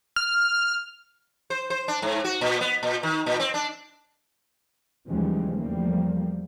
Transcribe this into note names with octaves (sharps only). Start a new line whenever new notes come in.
F6
C5
C5
D4
G#2
F#4
A#2
B3
A#2
D#3
A#2
C4
D4
D#2 C#3 E3 F3 G3 G#3
E2 F3 G3 A3 A#3